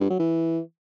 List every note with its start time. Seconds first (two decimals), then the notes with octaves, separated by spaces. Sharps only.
0.01 G2
0.10 F#3
0.20 E3